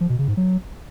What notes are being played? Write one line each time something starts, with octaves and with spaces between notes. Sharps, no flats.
F3
B2
C#3
G#2
F#3